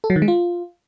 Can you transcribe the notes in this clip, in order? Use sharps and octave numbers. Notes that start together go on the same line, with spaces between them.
A4
F#3
D#3
G#3
F4